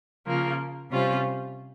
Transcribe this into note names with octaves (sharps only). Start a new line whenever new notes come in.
C#3 F3 A#3
C3 G3 C#4 F4 C5